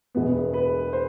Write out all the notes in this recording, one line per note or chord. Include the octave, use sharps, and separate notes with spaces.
E1 E2 B2 B3
B4
C5